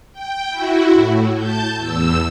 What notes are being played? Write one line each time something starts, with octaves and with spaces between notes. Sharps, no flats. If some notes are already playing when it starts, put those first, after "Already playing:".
G5
E4 F#4
A2
A5 G6
E2 E6